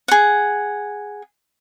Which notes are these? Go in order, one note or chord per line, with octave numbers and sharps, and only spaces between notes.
G#4 F#5